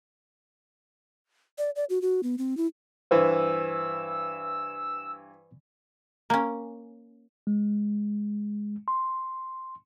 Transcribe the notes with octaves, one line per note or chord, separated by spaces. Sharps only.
D5
D5
F#4
F#4
B3
C4
E4
G2 E3 B4 C5 E6
A#3 C#4
G#3
C6